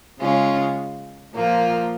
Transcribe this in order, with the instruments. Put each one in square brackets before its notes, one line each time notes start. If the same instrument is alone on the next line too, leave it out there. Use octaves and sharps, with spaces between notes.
[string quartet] C#3 G#3 C#4 F4
A#2 F3 A#3 F4